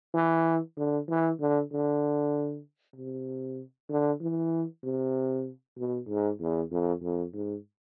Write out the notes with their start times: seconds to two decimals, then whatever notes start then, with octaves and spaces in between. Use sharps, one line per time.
0.14 E3
0.77 D3
1.09 E3
1.40 D3
1.72 D3
2.96 C3
3.90 D3
4.21 E3
4.84 C3
5.78 B2
6.08 G#2
6.40 E2
6.71 F2
7.02 F2
7.34 G#2